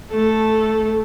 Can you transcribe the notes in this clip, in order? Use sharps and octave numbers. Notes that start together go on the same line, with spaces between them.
A3 A4